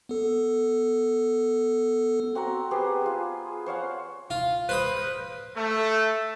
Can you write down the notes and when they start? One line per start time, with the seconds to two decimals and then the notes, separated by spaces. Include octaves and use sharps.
0.09 B3 A4
2.35 C4 F#4 F#5 A#5
2.71 B3 G4 G#4 C5
3.01 F4 G#4
3.66 C5 C#5 F5 F#5
4.30 F4
4.69 B4 C5 B5 D#6
5.56 A3